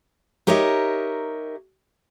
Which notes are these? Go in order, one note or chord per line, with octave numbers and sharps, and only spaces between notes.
D#4 G4 A#4 C#5 D#5 E5